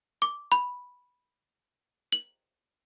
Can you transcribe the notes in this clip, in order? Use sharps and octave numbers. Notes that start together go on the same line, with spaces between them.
D6
B5
F#7